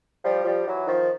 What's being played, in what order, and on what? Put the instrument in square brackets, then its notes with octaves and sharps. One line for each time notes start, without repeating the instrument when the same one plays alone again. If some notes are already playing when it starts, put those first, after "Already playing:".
[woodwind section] F3 G3
F3 G3
E3 F#3
D#3 F3